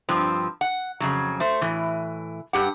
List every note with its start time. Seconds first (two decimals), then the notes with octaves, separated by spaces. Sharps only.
0.09 G2 F3 C4
0.61 F#5
1.00 F2 C#3 F#3
1.40 A3 C5
1.62 A2 E3
2.53 G2 G4 F#5